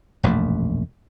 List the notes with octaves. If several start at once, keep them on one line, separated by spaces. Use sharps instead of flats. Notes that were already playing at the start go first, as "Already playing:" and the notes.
E1 A#1 F#2 A3